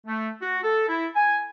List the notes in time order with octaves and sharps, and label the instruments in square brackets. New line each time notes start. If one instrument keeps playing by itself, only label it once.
[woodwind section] A3
F#4
A4
E4
G#5